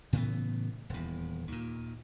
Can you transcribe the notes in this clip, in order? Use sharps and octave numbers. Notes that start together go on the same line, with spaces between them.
A2 C#3 E3 B3
D#1 E2
D#2 A#2